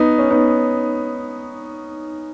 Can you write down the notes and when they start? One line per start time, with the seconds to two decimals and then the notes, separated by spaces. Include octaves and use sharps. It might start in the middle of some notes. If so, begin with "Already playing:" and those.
Already playing: B3 D#4
0.18 C#4
0.30 B3 D#4